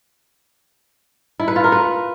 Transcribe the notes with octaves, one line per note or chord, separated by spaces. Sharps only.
E4
B4
F4
A#4
B4